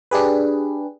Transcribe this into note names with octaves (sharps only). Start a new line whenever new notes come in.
D4 G4 G#4 B4